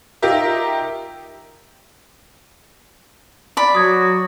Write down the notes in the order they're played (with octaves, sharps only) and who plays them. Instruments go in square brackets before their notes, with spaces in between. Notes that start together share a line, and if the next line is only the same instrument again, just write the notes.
[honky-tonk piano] D#4 F4 G4 A#4 E5
[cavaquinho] D5 B5
[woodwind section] F#3 F#4 [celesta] D#6 G#6